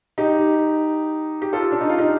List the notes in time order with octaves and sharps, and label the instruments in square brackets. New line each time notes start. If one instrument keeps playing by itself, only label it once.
[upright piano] D#4 G4
G4
F4 A4
D4
D#4
F4
D#4 G4